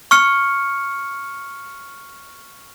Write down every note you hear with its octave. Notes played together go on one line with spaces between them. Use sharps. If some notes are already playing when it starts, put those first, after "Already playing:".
C#6 F6 C#7